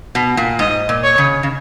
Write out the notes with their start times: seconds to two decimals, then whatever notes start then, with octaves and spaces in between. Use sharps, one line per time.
0.15 B2
0.37 A#2
0.59 G#2 D#5
0.89 A#2
1.03 C#5
1.18 C#3
1.43 C#3